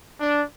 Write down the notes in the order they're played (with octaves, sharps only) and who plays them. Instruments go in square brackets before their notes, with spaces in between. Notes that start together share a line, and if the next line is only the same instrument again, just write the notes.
[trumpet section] D4